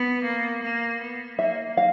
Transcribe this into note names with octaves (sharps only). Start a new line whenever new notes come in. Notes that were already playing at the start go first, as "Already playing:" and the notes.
Already playing: B3
A#3
A#3
B3
A#3 E5
F5